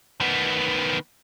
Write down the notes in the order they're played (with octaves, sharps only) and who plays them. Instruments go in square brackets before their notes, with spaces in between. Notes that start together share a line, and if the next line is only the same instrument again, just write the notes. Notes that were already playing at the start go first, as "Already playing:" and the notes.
[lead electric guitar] D#3 B3